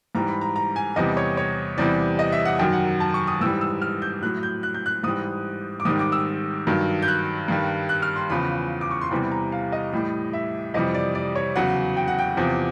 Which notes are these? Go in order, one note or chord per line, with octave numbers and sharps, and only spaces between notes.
G#2 E3 G3 A#5
B5
A#5
A#5
G#5
E2 C3 E3 G3 D#5
C#5
C#5
E2 C3 E3 G3 D5
D#5
E5
F#5
F#2 D#3 F#3 G5
F#5
A5
C#6
D#6
G#2 E3 G3 E6
E6
F6
G6
A2 F#3 F#6
G6
F#6
G6
F#6
G#2 E3 G3 D#6
D6
G#2 D#3 G3 D#6
D6
E6
G2 D#3 F#3
G6
F#6
G2 D#3 G3
F#6
F6
C6
E2 C#3 F3 B5
D6
C#6
C6
E2 C3 E3 G3 B5
A#5
F5
D#5
A2 E3 G3
E5
F2 C3 E3 G3 D#5
D5
D5
C#5
E2 C#3 F#3 F#5
G5
F#5
G5
E2 C3 F3